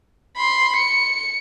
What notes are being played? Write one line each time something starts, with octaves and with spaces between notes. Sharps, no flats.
B5 C6
C#7